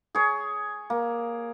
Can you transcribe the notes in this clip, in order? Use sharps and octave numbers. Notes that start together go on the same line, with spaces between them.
G#4 C#5
A#3